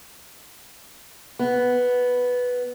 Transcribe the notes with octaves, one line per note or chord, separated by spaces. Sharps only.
B3